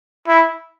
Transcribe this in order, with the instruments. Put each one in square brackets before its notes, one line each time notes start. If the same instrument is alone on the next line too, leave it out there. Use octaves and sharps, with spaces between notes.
[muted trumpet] E4